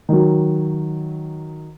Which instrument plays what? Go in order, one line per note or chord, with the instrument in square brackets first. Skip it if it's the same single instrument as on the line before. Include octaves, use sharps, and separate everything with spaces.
[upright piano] D#3 F#3